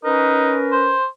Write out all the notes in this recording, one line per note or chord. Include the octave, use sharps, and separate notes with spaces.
C#4 D#4 A#4 B4
C5